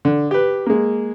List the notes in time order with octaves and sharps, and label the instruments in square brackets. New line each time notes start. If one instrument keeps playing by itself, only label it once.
[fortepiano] D3
G4 B4
G#3 A#3